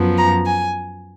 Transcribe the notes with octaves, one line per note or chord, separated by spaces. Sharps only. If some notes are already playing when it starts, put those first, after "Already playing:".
Already playing: F#2 F3 B3
A#5
G#5